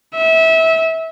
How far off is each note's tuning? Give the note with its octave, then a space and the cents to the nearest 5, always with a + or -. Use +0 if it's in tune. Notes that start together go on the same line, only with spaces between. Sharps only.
E5 -25